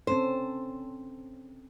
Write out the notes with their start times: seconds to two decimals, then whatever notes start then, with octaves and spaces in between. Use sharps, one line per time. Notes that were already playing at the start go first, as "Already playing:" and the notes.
0.07 C4 C#4 A4 C5